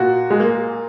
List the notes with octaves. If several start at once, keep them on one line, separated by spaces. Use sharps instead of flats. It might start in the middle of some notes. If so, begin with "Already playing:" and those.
Already playing: A#2 F#4
G#3
A#3